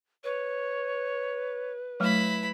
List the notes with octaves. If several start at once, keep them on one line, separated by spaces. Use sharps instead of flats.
B4 C#5
F#3 A3 E4 B5